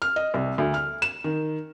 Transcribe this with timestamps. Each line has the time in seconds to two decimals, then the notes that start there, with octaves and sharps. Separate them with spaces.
0.02 F6
0.16 D#5
0.34 C2
0.58 D2
0.74 F6
1.02 E7
1.24 D#3